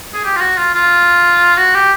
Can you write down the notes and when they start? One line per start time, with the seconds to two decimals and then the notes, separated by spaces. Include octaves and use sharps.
0.14 G#4
0.24 G4
0.36 F4
0.41 F#4
0.57 F4
0.75 F4
1.58 F#4
1.75 G4